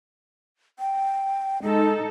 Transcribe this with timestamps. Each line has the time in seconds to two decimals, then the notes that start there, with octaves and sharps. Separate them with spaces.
0.79 G5
1.62 G#3 D#4 A4